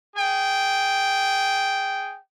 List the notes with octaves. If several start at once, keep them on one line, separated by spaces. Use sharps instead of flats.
G#4 G5